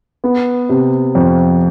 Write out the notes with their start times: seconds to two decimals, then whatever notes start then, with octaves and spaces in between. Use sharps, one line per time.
0.24 B3
0.69 C3
1.15 F2